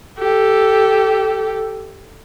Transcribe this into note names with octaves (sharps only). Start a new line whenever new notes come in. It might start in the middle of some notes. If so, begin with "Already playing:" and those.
G4 A4